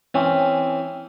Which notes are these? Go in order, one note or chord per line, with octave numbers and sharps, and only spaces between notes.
E3 C4 C#4